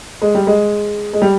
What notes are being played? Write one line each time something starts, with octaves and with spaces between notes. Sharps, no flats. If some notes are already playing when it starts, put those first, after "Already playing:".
G#3
G3
G#3
G#3
G3